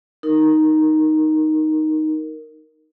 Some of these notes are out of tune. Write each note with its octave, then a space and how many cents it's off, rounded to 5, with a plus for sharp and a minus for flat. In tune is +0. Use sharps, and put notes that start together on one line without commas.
D#4 +0 A#4 +0